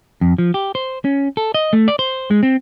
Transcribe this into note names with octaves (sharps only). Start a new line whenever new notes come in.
F2
F3
G4
C5
C#4
A4
D#5
A3
D5
C5
G#3
C4